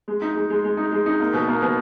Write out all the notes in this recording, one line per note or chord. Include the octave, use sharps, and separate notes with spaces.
G#3
D#4
G#3
G#3
G#3
D#4
G#3
D#4
A#3
B2
A#3
B2